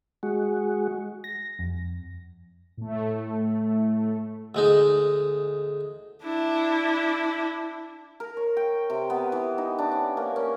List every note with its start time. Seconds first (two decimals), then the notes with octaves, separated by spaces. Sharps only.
0.23 G#3 F#4
1.24 A#6
1.59 F2
2.77 A2 A3
4.55 D2 G#3 D#4
6.24 D4 E4
8.20 A#4
8.37 C#5
8.57 G5
8.90 C3
9.10 B3
9.32 E3
9.58 D#4
9.78 D4
9.92 C#4
10.17 A#3
10.36 C#4